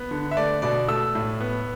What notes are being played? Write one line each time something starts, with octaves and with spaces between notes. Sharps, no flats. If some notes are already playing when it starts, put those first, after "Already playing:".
Already playing: B3
D3
E5
A3 D5
B2 D5
A3 E6
A2
B3